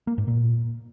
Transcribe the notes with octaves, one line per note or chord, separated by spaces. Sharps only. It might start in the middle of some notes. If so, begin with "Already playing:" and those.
A#3
G#2
A#2